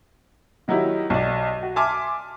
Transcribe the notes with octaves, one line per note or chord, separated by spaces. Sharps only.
D#3 F#3 D#4 E4 G4
B1 D5
F#4
E5 G#5 A5 C6 D6 F6